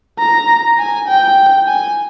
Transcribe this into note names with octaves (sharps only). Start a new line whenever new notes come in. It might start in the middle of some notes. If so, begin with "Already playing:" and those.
A#5
G#5
G5
G#5